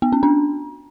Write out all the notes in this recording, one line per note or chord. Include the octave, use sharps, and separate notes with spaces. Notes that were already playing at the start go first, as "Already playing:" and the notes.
B3
C#4
D4